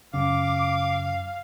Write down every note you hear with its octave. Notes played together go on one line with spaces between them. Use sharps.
F#2 C#3 F5 D6